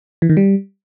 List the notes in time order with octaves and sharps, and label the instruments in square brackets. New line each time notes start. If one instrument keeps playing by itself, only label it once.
[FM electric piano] E3
D#3
G3